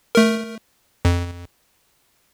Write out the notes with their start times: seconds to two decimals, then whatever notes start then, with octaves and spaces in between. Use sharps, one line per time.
0.15 A3 A#4
1.05 F2